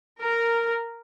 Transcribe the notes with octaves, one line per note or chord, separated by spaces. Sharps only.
A#4